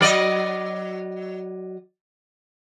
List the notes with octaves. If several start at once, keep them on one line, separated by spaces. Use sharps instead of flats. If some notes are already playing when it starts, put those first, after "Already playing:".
F#3 D5 D#5